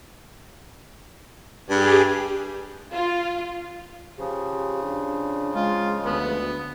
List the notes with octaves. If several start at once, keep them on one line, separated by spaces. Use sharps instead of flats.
G2 G4 G#4
F4
C#3 F3 G4
D4
G#3 F4
D2 B3